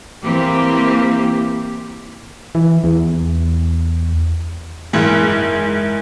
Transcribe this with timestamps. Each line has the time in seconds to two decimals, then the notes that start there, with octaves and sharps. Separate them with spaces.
0.23 E3 A#3 C4 G4
2.55 E3
2.84 E2
4.93 F#1 G#2 E3